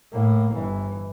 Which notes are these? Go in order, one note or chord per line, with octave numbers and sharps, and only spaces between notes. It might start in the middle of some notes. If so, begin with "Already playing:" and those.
A2 A#3
G1 E3